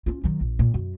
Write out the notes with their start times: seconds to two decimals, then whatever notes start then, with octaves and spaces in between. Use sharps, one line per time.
0.06 C#4 F4
0.24 D#3 F#3
0.41 A#1
0.59 A#2 D3
0.74 F#2